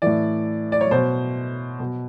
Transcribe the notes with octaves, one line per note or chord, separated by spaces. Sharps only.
A2 E3 D5
D5
C#5
B2 C5
B2